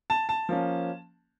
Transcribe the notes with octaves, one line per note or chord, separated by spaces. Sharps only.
A5
A5
F3 A#3 C#4